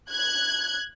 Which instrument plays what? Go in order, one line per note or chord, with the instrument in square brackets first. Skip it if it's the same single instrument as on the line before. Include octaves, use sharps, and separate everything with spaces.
[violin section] F#6 G#6